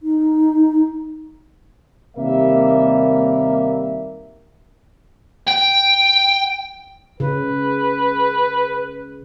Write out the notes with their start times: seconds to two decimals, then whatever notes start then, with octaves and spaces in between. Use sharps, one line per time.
0.03 D#4
2.17 D#2 C3 G3 A#3 A#4 E5
5.47 G5
7.20 C#3 B4